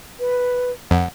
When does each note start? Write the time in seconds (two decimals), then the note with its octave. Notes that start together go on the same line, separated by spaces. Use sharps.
0.20 B4
0.91 F2 F#5